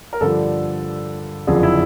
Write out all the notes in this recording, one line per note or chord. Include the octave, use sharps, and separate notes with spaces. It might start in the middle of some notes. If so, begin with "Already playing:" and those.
A#4
G2 D3 F3 A4
F#1 F2 D3 F3 G#4
E4